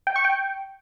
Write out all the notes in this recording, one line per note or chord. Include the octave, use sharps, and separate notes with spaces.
G5
C#6
G5